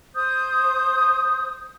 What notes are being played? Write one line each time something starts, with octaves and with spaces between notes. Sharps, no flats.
C5 D#6 G6